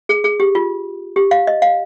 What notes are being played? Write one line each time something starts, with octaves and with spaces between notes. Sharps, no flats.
G#4
G#4
G4
F4
G4
F5
D#5
F5